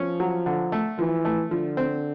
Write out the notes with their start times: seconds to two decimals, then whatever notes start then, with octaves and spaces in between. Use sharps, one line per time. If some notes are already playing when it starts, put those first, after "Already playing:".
Already playing: F3 C#4
0.20 F#3
0.46 D3
0.72 A3
0.99 E3 F3
1.25 A3
1.51 D3 F3
1.77 C4